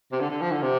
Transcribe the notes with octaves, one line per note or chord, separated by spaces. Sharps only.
C3
D3
D3
F3
D3
C3